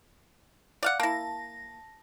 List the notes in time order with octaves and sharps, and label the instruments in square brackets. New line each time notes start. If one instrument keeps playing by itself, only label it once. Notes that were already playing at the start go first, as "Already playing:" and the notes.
[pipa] D5 F5 F#5
[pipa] A#3 E4 [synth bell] A5 A#6